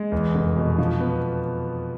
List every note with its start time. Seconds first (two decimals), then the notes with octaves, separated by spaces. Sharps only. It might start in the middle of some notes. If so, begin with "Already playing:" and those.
Already playing: G#3
0.12 E2
0.35 F1
0.56 B2
0.78 F3
1.00 B3